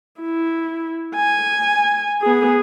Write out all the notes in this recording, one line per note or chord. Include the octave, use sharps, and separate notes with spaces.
E4
G#5
B3 G#4